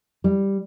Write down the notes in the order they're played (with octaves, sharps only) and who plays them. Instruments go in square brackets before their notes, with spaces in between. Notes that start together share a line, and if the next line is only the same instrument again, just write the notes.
[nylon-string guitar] G3